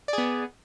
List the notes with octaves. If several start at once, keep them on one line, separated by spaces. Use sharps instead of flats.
B3 G#4 D5